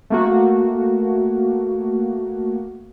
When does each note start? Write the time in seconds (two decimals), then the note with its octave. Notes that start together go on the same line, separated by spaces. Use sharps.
0.10 A3 A#3 F#4